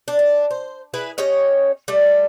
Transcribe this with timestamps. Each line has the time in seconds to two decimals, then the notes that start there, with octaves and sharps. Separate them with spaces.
0.08 D4
0.19 D4
0.51 C5
0.94 E4 G#4 B4
1.18 C#4 G4 C#5 D#5
1.88 G3 A3